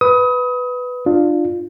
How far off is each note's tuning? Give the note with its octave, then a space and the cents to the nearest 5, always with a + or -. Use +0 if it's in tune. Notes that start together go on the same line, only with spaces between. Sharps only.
B4 +5 D#6 +30
D4 +30 F4 +0